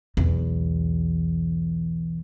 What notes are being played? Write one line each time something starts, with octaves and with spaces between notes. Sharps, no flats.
B1 E2